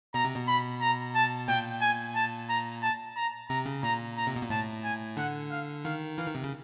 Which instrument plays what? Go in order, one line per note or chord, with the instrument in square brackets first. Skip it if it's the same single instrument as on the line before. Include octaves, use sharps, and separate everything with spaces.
[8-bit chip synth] B2 [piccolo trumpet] A#5
[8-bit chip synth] C3
B2
[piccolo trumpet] B5
A#5
A5
[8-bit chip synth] A#2 [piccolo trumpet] G5
[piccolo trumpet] G#5
A5
A#5
A5
A#5
[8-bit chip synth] C3 [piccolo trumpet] A#5
[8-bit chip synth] C#3
[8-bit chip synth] A#2 [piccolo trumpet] A#5
[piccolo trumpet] A#5
[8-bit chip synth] C3
B2
A#2
[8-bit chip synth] A2 [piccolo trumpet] A5
[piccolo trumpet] G#5
[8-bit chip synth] D3 [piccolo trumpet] F#5
[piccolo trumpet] F5
[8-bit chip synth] D#3 [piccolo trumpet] F5
[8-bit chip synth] E3 [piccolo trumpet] F5
[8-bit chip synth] D#3
C3
C#3